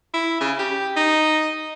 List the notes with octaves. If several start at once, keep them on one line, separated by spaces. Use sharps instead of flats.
E4
C#3
G4
D#4